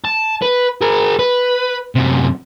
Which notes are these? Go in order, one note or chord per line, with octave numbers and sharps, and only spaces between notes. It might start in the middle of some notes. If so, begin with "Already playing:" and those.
A5
B4
G#4 A#4
B4
F#2 C3